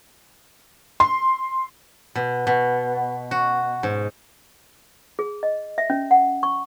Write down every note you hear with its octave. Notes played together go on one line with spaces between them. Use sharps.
C6
B2
B2
F#4
G#2
G#4
D#5
E5
C#4
F#5
C#6